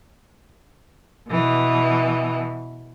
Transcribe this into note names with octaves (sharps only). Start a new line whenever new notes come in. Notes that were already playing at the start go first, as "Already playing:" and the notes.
B2 E3